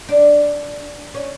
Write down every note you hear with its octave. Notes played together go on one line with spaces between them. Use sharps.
D4
C#4